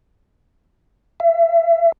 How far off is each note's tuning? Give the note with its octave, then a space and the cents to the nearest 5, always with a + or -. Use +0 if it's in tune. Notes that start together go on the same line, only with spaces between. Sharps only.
E5 +30